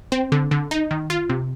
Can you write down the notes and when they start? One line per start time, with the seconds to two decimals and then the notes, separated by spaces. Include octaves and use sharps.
0.12 C4
0.32 D3
0.51 D3
0.71 D#4
0.91 D#3
1.10 F4
1.29 C3